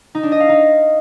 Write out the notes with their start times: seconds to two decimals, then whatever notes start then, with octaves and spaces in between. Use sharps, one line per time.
0.15 D#4
0.23 D4
0.32 D#5
0.40 F5
0.49 D#4